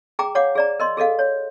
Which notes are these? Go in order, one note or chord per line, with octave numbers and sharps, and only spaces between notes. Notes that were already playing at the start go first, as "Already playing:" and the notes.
G#4 G5 A#5 D6
C#5 F5 F#5 D6
G#4 D5 A#5
A#4 D#5 C6
G#4 A4 D#5 F5
C#5